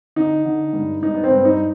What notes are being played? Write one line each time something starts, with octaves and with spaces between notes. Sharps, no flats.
D3 D#4
D3
G2
G2 D#4
B3
C4
G2
D#4